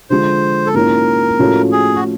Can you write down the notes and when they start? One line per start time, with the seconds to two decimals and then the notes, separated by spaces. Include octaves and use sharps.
0.10 D3 F3 G#3 C5
0.66 A4
0.74 G#2 F3 A#3 C#4 E4 A#4
1.39 A2 F3 A3 C#4 F#4
1.72 G#4
1.96 F#4